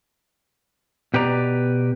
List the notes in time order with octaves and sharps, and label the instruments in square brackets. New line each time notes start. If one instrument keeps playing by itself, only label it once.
[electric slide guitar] B2 G4 B4 D5 A#5